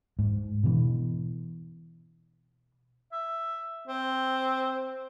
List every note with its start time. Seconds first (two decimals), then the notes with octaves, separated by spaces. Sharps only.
0.19 G#2
0.64 B2 E3
3.12 E5
3.88 C4